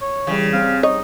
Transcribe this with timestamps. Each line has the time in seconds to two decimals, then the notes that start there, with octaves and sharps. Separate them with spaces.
0.01 C#5
0.27 C#3 E3 G3
0.53 G3 C4 F5
0.83 D#4 C#5 D#5